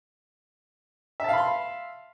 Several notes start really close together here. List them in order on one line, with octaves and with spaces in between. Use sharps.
E5 A5 F5 B5 C6